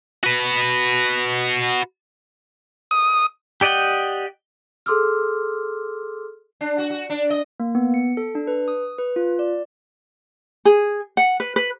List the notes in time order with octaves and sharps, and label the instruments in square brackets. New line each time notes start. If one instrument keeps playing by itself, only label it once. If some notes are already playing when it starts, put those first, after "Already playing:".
[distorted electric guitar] F#4 B4
[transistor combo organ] D#6
[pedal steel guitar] G4 D5 D#5 F#5 G5
[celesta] G#4 A4 C6 D6 E6 F6
[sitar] D4
F#4
F#4
D4
D#5
[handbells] A#3
B3
C#7
A4
D4
B4
D#6
B4
F4
D5
[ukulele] G#4
F#5
B4
B4